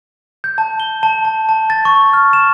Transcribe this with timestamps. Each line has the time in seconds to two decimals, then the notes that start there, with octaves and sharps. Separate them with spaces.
0.44 G6
0.58 A5
0.80 G7
1.03 A5
1.25 A5
1.49 A5
1.70 A6
1.85 C#6
2.13 F6
2.33 E7